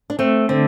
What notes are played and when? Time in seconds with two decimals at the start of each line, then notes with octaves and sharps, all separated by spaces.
0.10 D4
0.19 A3 C4
0.49 D3 C4